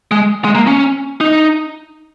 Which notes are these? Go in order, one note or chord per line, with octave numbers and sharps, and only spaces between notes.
G#3
G#3
A#3
C#4
D#4